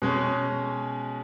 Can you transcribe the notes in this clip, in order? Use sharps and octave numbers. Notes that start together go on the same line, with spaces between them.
B2 G#3 C#4